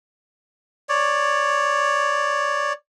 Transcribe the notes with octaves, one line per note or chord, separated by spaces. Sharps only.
C#5 D5